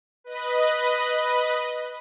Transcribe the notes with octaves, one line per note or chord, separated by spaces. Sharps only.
B4 D#5 B5